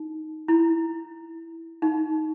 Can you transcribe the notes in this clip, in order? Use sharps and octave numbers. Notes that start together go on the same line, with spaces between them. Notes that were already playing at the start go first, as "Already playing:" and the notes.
Already playing: D#4
E4
D#4